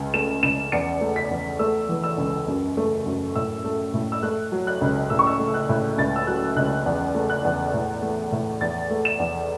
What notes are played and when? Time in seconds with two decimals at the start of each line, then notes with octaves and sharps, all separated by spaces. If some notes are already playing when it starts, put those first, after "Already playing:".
Already playing: C#2
0.14 A3 E7
0.43 C#2 E7
0.72 E2 C#7
1.01 A3
1.16 B6
1.31 E2
1.59 A3 E6
1.89 E3
2.04 E6
2.18 C#2
2.48 F#2
2.77 A3
3.06 F#2
3.35 A2 E6
3.64 A3
3.94 A2
4.12 E6
4.23 A3 F#6
4.52 F#3
4.67 F#6
4.81 C#2
5.10 A2 E6
5.19 C#6
5.27 E6
5.40 A3
5.54 F#6
5.69 A2
5.98 C#2 A6
6.16 E6
6.27 F#3 F#6
6.56 C#2 F#6
6.86 E2
7.15 A3
7.30 F#6
7.45 E2
7.74 A2
8.02 A3
8.32 A2
8.61 E2 A6
8.91 A3
9.05 E7
9.19 E2